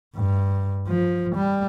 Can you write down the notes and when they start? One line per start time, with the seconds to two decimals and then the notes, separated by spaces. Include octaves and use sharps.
0.16 G2
0.87 F3
1.35 G3